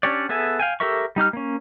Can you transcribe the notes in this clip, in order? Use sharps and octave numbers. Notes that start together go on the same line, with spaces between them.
C#4 D4 G4 C#5 D5
B3 G#4 A4 E5 G#5
F5 G5 G#5
G4 A4 A#4 E5 C#6
G3 D#4 G4 F6
A#3 C#4